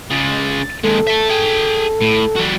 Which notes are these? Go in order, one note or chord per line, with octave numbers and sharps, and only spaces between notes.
C#3 G#3 A6
D#2 G#3 A4
E5 A5
G#4 G5
A2
G3 F#4